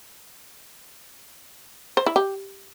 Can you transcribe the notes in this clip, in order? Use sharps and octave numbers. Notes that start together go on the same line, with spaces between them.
C5
E4
G4